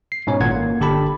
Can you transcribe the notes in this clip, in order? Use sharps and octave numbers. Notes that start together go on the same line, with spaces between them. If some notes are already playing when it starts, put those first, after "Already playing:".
C7
G#2 B2 C#4 C#5
G#1 A#2 F#5 G#6
A#3
G1 D3 G4 A5 B5